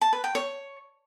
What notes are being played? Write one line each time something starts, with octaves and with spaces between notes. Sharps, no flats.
A5
B4
G5
C#5